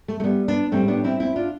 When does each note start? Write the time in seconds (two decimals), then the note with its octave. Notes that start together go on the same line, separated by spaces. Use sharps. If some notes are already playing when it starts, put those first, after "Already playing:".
0.08 A3
0.20 A3
0.24 G3 B3
0.48 B3 D4
0.72 A2 G3 A3 C4
0.88 B3 D4
1.04 C4 E4
1.20 C4 E4
1.36 D4 F4